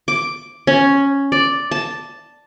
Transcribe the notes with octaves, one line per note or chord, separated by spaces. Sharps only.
D6
C#4
D5
A5